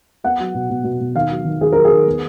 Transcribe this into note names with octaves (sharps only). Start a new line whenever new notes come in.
B3 F#5
F#3
B2
B2
B2
B2
D#3 F5
F#3
D#3
D#3 G#4
F#3 A#4
G#4
D#3
B3